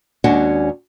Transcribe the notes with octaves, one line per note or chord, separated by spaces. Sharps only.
D#2 G#3 C#4 D4 F#4 F#5